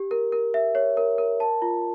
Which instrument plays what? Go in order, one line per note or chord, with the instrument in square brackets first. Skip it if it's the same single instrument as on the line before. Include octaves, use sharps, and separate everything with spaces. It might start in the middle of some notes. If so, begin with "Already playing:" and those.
Already playing: [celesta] G4
A#4
A#4
E5
C#5
A#4
A#4
A5
F4